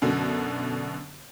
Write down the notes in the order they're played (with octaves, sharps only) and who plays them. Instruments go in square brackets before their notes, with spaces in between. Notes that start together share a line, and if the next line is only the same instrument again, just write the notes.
[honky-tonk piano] F#2 B2 D3